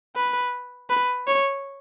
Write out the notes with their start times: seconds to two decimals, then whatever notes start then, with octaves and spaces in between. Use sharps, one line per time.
0.16 B4
0.90 B4
1.27 C#5